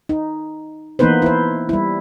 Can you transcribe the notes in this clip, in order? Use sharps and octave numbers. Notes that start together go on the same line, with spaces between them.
D#4
E3 A#3 B3 D#4 B4 C5
E4 C5
G3 E4